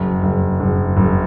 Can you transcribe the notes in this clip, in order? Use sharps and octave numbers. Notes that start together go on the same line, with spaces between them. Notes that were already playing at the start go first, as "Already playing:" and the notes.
Already playing: F#1
F#1
F#1
F#1